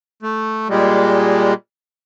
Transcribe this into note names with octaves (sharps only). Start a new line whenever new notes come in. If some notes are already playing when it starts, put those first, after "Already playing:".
A3
A#2 G3 G#3